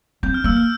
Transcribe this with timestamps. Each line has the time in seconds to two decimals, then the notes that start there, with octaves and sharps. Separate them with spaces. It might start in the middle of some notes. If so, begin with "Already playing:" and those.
0.23 C4 G6
0.34 F6
0.44 A#3 E6
0.57 F6